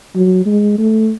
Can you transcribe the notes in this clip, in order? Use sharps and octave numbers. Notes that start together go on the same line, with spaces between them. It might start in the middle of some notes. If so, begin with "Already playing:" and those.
F#3
G#3
A3